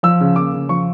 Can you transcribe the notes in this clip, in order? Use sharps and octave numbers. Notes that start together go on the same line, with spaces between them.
F3 E6
C#3
A#3 D6
C#3
F3 C#6